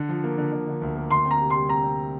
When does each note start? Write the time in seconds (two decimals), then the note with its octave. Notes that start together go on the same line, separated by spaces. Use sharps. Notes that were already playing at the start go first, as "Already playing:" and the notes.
Already playing: D3
0.09 F3
0.24 A#3
0.38 D3
0.52 D3
0.67 D3
0.82 D2
0.96 A#3
1.11 D2 C6
1.26 C4
1.31 A#5
1.40 C3
1.50 C6
1.55 G3
1.69 C4 A#5
1.84 C4